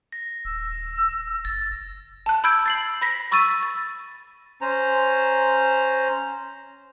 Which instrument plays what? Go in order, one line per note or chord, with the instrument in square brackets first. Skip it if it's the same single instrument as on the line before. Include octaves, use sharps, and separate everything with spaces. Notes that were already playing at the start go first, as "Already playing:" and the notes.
[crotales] A#6
[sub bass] D#1 [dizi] E6
[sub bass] F#1 [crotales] A6
[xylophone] A5 F#6
B5 E6 G6 G#6 D7
A6 C7 F#7
B5 A#6 B6
B5 C#6 E6 A6 D#7
A6
[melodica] C#4 C5 A#5